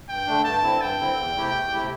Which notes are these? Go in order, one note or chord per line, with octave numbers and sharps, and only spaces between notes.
G2 G5
D3 A3 D4
G2 A5
D3 C4 E4
G2 G5
D3 C4 E4
E2
C3 A3 E4 G4
E2
C3 A3 E4 G4